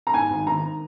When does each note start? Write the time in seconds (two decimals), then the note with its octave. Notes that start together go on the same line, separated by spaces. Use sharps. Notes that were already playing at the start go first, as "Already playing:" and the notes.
0.07 A#5
0.14 G#2 G#5
0.30 G#1
0.47 D#3 A#5